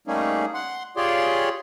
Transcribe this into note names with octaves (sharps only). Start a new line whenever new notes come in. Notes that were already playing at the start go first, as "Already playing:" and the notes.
G3 A3 A#3 C#4 D#4 G#4
F#5 C6
F4 G4 G#4 C#5 D5 C6